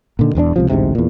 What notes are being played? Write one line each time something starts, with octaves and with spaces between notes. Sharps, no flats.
A#2 D3 D#3
E1 E2 C4 D4
C#2 C3 F3
A1 D2 G#2 C3
E2 A#2